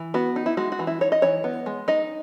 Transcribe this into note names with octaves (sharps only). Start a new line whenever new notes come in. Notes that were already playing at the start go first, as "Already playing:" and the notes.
Already playing: E3
B3 F#4
D#4
E4
G#3 F#4
F#4
E3
E4
D#4 C#5
D#5
E3 C#5
B3
G#3
D#4 D#5